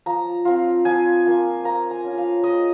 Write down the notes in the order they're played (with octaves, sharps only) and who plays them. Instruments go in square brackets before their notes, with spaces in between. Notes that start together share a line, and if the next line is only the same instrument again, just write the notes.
[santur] F3 A#5
C4 F4
F3 G#5
A#3 F4
A#3 A#5
G#5
C#4 F4
F5
G#3 D#5